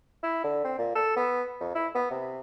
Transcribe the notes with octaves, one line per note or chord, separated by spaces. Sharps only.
E4
D3
C4
A#2
A4
B3
F2
E4
B3
C3